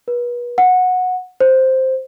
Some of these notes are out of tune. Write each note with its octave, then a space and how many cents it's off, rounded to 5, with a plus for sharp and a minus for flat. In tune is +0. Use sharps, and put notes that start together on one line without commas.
B4 -35
F#5 -15
C5 +0